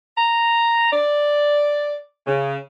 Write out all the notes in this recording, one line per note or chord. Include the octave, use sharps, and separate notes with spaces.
A#5
D5
C#3